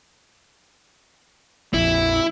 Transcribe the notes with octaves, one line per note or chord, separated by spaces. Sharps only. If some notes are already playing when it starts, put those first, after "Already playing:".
A#1 F2 E4